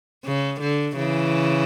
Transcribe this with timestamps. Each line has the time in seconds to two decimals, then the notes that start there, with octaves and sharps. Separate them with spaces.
0.25 C#3
0.60 D3
0.97 C#3 E3